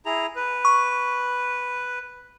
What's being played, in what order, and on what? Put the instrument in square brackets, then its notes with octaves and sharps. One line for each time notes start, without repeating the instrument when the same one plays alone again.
[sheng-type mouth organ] E4 G#4 A#5
B4
[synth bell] C#6